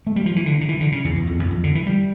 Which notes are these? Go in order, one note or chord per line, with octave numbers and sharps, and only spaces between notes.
A3
G3
F3
E3
D3
D3
E3
D3
C#3
E2
E2
F2
E2
F2
D3
E3
G3